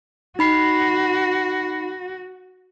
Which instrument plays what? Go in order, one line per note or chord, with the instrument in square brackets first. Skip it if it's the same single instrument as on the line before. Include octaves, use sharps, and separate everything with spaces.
[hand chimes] D#4 B5 C7 [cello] F#4